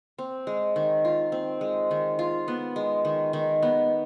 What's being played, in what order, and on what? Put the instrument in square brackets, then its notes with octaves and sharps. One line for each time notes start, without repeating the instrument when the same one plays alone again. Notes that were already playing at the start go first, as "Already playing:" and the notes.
[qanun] C4
G#3
D#3
F4
C4
G#3
D#3
F4
B3
G#3
D#3
D#3
B3